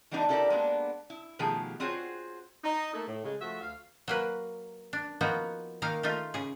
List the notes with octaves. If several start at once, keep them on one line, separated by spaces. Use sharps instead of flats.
E3 G3 B3 D4 D#4
E4 G4 A4 A#4 C5 D5
G#3 A#3 B3 D4
E4
B2 D#3 F3 A3 G4 G#4
C4 F4 F#4 G#4 C5 C#5
D#4
A3 A#3 D#4 A4
A2
C#3 G#3
F3 A3 F#4 E5
D2 F5
F#3 A#3 B4
D4
F3 A#3 B3 D#4 F#4
D#3 A#3 D#4 F5
A3 D#4 F4
C#3 G#4